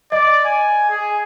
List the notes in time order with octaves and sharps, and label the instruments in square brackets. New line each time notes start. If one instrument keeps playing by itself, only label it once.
[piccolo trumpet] D5 [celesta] D#5
[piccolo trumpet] G#5
G#4